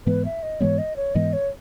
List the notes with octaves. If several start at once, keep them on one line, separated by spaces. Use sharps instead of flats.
G#2 E3 G#3 B3 B4
E5
D#5
G#2 E3 G#3 B3 C#5
D#5
C#5
G#2 E3 G#3 B3 D#5
C#5